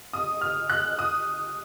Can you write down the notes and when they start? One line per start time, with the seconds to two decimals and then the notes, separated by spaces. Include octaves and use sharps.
0.13 D#6
0.41 F6
0.70 F#6
0.99 D#6